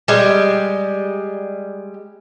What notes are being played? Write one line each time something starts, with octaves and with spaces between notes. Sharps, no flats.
G3 G#3